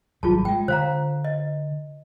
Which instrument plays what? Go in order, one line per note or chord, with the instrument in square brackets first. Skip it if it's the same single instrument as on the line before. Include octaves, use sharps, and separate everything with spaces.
[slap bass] G#1 F#3 G3 [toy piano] F4 G#4 A5
[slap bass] G3 G#3 [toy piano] G5
[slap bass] D3 [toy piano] C5 F5 A#5
[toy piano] D#5